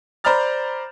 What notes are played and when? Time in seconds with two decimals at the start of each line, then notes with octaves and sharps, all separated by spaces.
0.24 C5 D5 A#5 B5 F6 A6